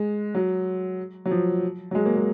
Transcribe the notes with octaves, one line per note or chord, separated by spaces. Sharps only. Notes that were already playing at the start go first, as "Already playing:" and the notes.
Already playing: G#3
F#3
F#3
F3
F#3
G#3
A#3
G#3